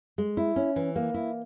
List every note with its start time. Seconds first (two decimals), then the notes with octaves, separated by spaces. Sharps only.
0.18 G#3
0.37 E4
0.56 C#4
0.76 E3
0.96 A#3
1.14 E4